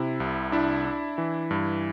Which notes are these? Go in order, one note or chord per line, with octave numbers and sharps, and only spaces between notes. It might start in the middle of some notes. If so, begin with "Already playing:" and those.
Already playing: C3 E4
C2
D4 E4
D4
E3
G2